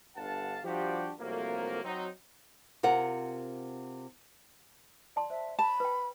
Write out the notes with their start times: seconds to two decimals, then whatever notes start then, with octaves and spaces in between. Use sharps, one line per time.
0.16 G1 G2 D3 F5 F#5 A5
0.64 F3 G3 D4 F#4 G4
1.20 C2 F2 F#3 A3 A#3
1.83 F#3 C4 D#4
2.83 C3 F4 A#4 F#5
5.16 D5 A5 C6
5.30 C5 E5
5.59 A5 B5
5.80 B4 G5